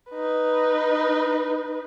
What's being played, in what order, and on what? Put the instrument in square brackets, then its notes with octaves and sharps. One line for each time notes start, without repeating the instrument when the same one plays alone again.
[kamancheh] D#4 B4